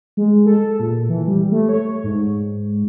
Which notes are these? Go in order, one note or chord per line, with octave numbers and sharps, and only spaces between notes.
G#3
A4
A#2
E3
G3
A3
C#5
G#2